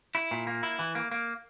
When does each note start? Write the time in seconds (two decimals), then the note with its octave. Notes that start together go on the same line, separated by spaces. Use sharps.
0.15 E4
0.31 A#2
0.47 A#3
0.63 E4
0.79 E3
0.95 A#3
1.11 A#3